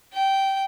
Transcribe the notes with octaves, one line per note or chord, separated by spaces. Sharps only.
G5